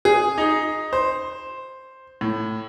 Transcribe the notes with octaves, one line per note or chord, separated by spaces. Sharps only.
G#4
D#4
C5
A2